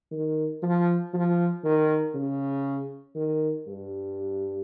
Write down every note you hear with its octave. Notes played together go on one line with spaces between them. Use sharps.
D#3
F3
F3
D#3
C#3
D#3
G2